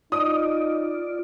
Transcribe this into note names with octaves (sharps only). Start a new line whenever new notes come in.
D#4 F4 D5 D#6